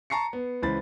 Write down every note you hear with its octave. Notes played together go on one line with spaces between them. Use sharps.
A5 A#5 C#6 C7 C#7
B3
C#2 E3 C5 B5 A6